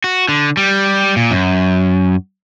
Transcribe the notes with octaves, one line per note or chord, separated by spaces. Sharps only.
F#4
D3
G3
A#2
F#2